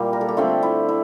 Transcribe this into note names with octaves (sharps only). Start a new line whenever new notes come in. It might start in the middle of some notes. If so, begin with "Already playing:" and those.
Already playing: A#2 G3 A#3 E4 G4
A#4
A4
G4
D3 A3 C4 F4
E4
E4